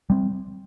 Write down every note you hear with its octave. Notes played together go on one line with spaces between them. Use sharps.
G3 C4